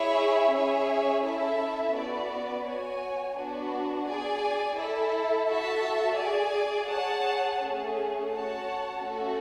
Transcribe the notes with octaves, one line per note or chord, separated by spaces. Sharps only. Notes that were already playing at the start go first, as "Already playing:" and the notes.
Already playing: E4 G#4 C#5 E5
C#4 G#4 C#5 E5
C#4 E4 A4 E5 A5
B3 F#4 B4 D5
F#4 C#5 G#5
B3 D4 F#4
G#4 D5 G#5
E4 A4 E5
F#4 A4 E5 A5
G#4 D5 G#5
G#4 C#5 F#5 A5
A3 C#4 G#4
F#4 C#5 F#5 A5
A3 C#4 F#4 A4